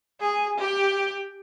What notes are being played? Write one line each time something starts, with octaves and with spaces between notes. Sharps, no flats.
G#4
G4